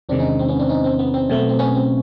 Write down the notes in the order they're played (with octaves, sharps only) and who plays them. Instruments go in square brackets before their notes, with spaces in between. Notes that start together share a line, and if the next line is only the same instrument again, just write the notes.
[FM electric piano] E2 C3 D#3 G#3 C4 D4
C#4 D#4
C4
B3 C#4
C4 D4
C#4 D#4
C4
B3
C4
B2 F#3 A3 C4
B3
C4
B3 C#4
C4